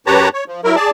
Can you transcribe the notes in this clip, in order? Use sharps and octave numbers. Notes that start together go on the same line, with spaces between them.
F#2 G4 B4 C#5 A5 A#5
C#5
F3
F#3 E4 A#4
G#4 D5 A5